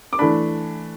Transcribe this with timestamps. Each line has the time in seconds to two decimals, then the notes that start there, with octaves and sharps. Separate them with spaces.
0.13 D6
0.19 E3 A3 D4 B5